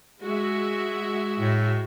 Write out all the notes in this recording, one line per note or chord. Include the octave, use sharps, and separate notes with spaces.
G#3 F#4 E5
A2